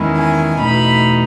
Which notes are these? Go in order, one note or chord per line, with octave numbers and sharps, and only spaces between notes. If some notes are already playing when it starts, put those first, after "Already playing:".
Already playing: E2 D#3 G#3 C#4 E4
G#5
E2 B2 A3 D#4 B5